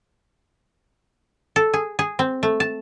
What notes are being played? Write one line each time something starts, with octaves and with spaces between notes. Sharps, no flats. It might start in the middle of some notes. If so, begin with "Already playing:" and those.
A4
G#4
G#4
C4
A3
A5